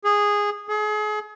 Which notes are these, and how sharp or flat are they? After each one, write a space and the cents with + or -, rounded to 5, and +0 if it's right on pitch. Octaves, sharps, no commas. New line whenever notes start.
G#4 -10
G#4 +35